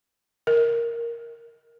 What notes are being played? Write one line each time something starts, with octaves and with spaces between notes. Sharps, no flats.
A#4